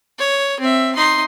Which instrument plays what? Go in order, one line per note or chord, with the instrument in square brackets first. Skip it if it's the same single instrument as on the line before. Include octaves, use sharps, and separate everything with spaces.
[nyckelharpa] C#5
C4 E5
D#4 C6